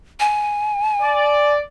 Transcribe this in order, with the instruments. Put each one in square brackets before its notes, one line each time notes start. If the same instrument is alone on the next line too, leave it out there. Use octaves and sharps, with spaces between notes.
[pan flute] G#5
[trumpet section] D5